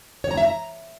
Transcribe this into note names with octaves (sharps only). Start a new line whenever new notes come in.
C#5
A#5
E5
A#5